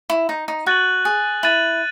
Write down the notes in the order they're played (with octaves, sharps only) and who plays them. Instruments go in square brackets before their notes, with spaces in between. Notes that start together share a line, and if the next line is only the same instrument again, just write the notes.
[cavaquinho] E4
D#4
D#4
[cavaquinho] F#4 [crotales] F#6 A6 D#7 F#7
[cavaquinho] G#4
[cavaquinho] E4 [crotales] F#6 A6 D#7 F#7